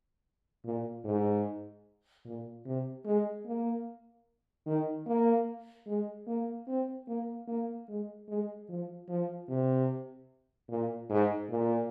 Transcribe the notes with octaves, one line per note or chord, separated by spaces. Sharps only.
A#2
G#2
A#2
C3
G#3
A#3
D#3
A#3
G#3
A#3
C4
A#3
A#3
G#3
G#3
F3
F3
C3
A#2
G#2
A#2